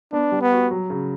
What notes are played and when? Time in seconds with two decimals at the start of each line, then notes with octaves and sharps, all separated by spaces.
0.13 B3 D4
0.32 G3
0.42 B3
0.51 F#4
0.71 F#3
0.90 C#3